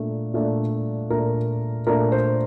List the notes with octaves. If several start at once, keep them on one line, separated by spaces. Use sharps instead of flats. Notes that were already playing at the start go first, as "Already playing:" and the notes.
Already playing: A#2 A3 D4
A#2 A3 D4
A#2 A3 D4 A#4
A#2 A3 D4 A#4
C5